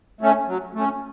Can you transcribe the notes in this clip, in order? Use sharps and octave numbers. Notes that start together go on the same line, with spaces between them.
A3 C#4
F#3
A3 C#4